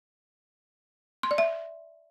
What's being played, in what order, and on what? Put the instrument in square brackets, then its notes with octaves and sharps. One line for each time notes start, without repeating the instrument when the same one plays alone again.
[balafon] C6
D5
E5